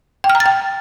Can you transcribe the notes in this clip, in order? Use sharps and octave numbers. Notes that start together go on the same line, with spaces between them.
G5
F6
A#5
A6
G5